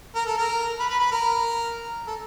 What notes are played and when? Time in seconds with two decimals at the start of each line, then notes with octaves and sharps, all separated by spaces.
0.15 A#4
0.26 A4
0.37 A#4
0.79 B4
0.90 B4
1.00 B4
1.11 A#4
2.07 A4